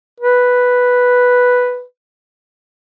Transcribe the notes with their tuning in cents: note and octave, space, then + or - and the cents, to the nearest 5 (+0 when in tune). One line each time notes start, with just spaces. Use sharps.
B4 +0